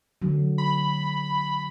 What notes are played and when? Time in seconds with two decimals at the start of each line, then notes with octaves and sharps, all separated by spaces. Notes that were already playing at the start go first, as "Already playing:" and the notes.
0.22 D3 F#3
0.58 B5